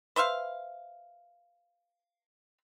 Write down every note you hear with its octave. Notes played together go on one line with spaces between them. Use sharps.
B4 C5 E5 F5